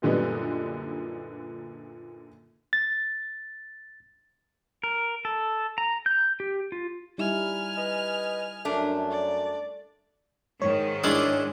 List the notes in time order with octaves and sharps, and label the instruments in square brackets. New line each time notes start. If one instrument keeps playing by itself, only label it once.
[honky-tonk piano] F#2 A#2 D3 G3 B3 D#4
[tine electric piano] A6
[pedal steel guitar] A#4
A4
A#5
G6
G4
F4
[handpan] G3 D#4 E4 [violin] G#5 F6
[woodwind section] B4 D#5
[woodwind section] F#2 [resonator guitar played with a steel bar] A3 D4
[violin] D5
[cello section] G#2 D#3 [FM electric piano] C#5
[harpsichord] G#3 C#4 E4 [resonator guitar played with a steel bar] D4 G#4 D5